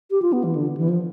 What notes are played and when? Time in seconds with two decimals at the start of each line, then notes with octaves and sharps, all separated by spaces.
0.11 G4
0.22 F4
0.33 B3
0.44 E3
0.55 D3
0.77 E3
0.88 F3